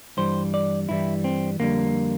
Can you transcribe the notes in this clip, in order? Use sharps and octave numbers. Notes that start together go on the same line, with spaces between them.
G2 E3 G3 C5
D5
G2 E3 G3 E4
C4
F2 D3 G3 A#3